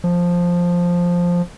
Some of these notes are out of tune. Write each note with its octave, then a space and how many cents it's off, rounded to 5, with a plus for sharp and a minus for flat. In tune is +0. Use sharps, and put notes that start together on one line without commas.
F3 +5